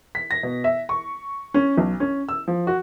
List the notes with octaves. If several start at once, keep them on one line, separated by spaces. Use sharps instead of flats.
B6
A#6
B2
E5
C#6
C#4
B1
C#4
E6
F3
F#4